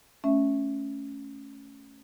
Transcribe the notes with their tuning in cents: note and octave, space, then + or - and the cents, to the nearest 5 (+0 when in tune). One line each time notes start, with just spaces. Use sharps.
A3 -10 C#4 +0 E5 +0